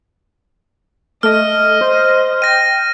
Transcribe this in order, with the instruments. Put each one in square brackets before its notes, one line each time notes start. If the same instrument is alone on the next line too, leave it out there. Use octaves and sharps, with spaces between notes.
[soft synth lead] A3 [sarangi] D#5 [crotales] F6
[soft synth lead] C5
[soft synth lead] G5 [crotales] A#6 D#7